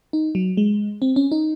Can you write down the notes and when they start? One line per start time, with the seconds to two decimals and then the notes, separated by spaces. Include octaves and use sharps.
0.13 D#4
0.35 F#3
0.57 G#3
1.02 C4
1.16 C#4
1.32 D#4